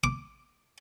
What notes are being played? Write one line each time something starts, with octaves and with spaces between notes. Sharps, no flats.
D6